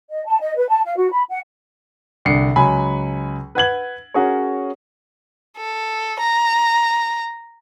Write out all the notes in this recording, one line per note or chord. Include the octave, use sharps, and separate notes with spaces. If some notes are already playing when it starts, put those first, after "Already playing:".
D#5
A5
D#5
B4
A5
F5
F#4
B5
F#5
C2 D3 C7 C#7
C#2 F#3 G#5 B5
B4 F#5 G#6 F#7
C#4 F#4 G#4 A#4 C#5
A4
A#5